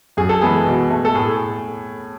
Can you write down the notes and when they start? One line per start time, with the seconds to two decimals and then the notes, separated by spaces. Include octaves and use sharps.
0.17 F#2 G#4
0.29 A4
0.42 E3 G#3 B3 G#4
0.66 B2
0.90 A3
1.05 A4
1.15 A2 G#4